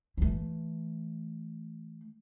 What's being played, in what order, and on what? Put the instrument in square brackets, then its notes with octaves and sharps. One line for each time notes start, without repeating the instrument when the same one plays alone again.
[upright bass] E3 A3